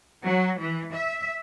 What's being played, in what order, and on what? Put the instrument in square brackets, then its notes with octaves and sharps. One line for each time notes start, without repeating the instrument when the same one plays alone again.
[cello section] F#3
E3
E5